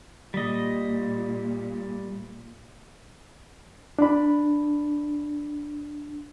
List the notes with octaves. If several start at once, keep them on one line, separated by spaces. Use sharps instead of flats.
A#2 G3 D#5
D4 B5